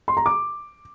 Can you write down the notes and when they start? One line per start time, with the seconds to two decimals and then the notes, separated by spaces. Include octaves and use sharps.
0.08 C6
0.17 A#5
0.26 D6